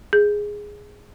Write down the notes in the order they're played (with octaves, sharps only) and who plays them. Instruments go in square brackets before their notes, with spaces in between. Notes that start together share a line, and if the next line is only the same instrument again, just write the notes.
[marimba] G#4